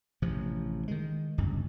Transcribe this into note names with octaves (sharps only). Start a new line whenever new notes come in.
A1 C3 F3
D#3 G#3
D1 G1 C#2 G2